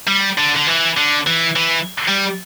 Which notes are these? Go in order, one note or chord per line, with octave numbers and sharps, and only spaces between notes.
G3
D3
D3
E3
D3
E3
E3
G3